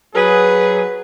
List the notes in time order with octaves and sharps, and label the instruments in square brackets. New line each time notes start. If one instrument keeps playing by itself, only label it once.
[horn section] F#3 G#4 [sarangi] B4